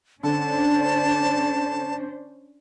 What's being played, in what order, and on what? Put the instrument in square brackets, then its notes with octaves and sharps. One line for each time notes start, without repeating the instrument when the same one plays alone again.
[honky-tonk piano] D3 [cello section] C#4 D4 C5 [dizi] A5